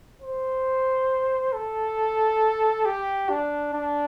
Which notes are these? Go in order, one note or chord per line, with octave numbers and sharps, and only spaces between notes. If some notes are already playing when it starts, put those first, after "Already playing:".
C5
A4
G4
D4
D4